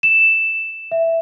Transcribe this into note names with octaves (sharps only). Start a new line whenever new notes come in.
E7
E5